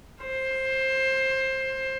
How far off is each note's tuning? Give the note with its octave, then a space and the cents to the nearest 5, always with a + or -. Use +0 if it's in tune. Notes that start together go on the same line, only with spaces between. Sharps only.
C5 +15